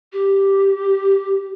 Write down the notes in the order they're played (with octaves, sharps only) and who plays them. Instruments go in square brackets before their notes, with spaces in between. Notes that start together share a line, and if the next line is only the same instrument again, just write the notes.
[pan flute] G4